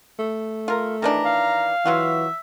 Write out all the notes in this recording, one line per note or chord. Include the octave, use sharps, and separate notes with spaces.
A3
F4 A#4
D#3 E3 D4 A#5
F5
E3 F#3 F4 F#4 E5